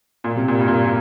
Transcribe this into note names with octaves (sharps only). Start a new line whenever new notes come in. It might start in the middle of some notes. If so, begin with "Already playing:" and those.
A#2
C3
A#2
G2
A#2
A#2